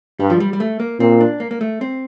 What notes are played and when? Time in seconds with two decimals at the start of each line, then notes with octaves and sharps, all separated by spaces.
0.20 G2 G3
0.30 F3
0.40 G3
0.53 G3
0.60 A3
0.80 A#3
1.00 A#2 C4
1.20 D4
1.40 A#3
1.51 A#3
1.61 A3
1.81 C4